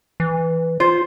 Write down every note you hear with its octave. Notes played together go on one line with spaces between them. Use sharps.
E3
F4 C5